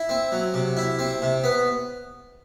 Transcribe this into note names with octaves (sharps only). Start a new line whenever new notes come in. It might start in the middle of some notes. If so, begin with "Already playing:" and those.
Already playing: E4
C4
F#3
C3
E4
C4
C3
B3